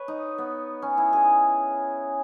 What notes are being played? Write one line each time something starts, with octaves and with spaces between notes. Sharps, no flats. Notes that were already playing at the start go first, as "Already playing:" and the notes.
Already playing: B4 C#5
D#4
B3
C#4
E4
G#4